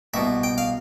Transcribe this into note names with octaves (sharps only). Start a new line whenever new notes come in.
C2 B2 E5
G5
F5